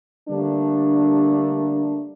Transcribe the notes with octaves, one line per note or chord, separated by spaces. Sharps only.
D3 G3 A3 A#3 D4